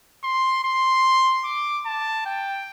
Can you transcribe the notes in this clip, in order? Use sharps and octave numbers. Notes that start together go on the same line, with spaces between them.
C6
C6
D6
A5
G5